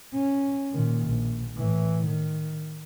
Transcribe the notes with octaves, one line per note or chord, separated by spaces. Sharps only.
C#4
A#2 D#3
A#1
A2 E3
D#3